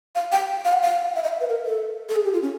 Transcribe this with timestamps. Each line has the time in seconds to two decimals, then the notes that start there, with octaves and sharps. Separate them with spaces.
0.15 F5
0.32 G5
0.65 F5
0.73 F#5
0.82 F5
1.16 E5
1.24 D#5
1.29 F5
1.32 E5
1.41 B4
1.49 A#4
1.66 A4
2.09 A4
2.16 G#4
2.25 G4
2.33 F4
2.42 C#4